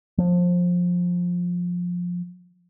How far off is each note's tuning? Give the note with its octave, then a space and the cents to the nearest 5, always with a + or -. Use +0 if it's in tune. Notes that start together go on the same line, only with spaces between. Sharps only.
F3 +20